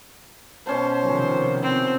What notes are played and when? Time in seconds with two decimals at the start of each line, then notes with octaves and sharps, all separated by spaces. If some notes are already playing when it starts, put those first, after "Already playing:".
0.67 B2 C#4 C5 A5
1.02 C3 D#3 F3
1.63 C4